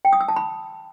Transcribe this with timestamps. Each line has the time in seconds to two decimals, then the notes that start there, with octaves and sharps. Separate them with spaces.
0.05 G5
0.13 D#6
0.21 E6
0.28 A5
0.36 B5